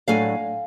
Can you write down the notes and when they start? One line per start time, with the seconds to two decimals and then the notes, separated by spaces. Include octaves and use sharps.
0.07 A2 F#3 A3 D4 F5 G#5